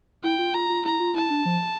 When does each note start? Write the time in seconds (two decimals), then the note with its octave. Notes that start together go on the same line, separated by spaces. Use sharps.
0.23 E4 G5
0.39 F4
0.54 F4 A#5
0.69 F4
0.85 E4 A#5
1.00 F4
1.15 E4 A5
1.30 D4
1.46 F3